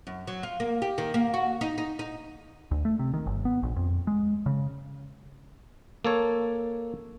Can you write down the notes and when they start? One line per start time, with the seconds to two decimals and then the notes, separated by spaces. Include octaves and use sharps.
0.07 F#2
0.27 F#3
0.43 F4
0.60 A#3
0.82 G4
0.98 D#3
1.14 A#3
1.34 F#4
1.61 D#4
1.78 D#4
1.99 D#4
2.71 D2
2.85 A3
2.99 C3
3.14 D#3
3.26 G1
3.45 B3
3.63 A#1
3.76 F2
4.07 G#3
4.46 C#3
6.05 A#3 A4 C#5